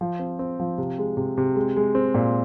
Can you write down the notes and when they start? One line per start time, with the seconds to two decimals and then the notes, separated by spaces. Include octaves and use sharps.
0.01 F3
0.19 C4
0.39 C4
0.60 F3
0.78 C3
0.98 G#3
1.17 C3
1.38 C3
1.56 G#3
1.76 G#3
1.95 C4
2.14 A#2